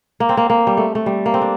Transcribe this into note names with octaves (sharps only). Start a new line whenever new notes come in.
A#3
C4
A#3
A#3
G3
A3
A3
G3
A#3
C4
D4